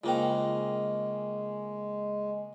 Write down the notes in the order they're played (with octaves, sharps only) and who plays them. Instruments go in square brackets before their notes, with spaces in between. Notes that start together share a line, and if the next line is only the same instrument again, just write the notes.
[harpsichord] C#3 A#3 A#5 [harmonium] G#3 [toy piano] F4 C5 G5